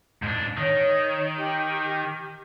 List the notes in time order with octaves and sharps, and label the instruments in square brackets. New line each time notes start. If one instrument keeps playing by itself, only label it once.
[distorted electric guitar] G#2 D4
[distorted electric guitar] D#3 [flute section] C#5
[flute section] G4